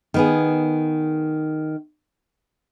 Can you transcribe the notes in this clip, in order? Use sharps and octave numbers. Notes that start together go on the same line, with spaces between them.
D#3 B3 G#4